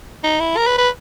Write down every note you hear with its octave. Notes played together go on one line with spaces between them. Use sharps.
D#4
E4
A#4
B4
B4